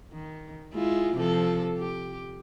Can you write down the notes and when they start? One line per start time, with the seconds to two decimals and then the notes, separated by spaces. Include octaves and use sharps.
0.11 D#3
0.74 G#3 E4 F4
1.16 C3 F3 A4
1.78 G4